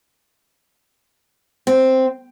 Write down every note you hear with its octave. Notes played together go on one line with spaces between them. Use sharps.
C4